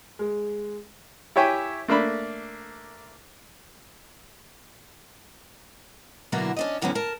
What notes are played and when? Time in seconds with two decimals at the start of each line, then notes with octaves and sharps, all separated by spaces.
0.19 G#3
1.36 E4 G4 C#5 E5 G5 G#5
1.88 A3 A#3 D4 B5
6.32 B2 D3 F#3 A#3 E4 F#4
6.57 C#4 D4 D#5
6.82 F2 D3 E3 F#3 B3 C#4
6.95 A#4 A5